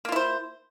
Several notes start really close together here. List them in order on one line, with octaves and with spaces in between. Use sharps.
A#3 F4 E4 C5